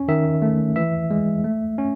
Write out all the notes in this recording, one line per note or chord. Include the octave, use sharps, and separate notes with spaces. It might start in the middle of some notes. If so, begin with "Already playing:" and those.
Already playing: C#4
D#3 E5
A3
E3 E5
G#3
A3
C#4